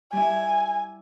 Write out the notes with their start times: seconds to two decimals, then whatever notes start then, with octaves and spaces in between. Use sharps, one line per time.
0.13 G3 E4 G#5